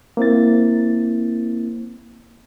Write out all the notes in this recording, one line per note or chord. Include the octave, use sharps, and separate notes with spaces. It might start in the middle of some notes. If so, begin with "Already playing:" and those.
A#3 C4 E4 A6